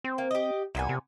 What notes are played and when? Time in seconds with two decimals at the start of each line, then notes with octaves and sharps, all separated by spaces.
0.04 C4
0.18 A#3
0.31 G4 D#5
0.75 C2 A#2 B3 G#5
0.89 C3